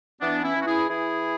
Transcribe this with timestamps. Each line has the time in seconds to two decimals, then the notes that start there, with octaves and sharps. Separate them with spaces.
0.21 E3 B3 D4
0.44 C#4 E4
0.55 E3
0.61 F#4
0.66 E4 G#4
0.89 E3 E4 G#4